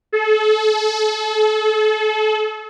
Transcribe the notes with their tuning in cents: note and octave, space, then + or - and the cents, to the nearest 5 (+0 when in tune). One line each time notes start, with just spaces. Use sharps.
A4 -35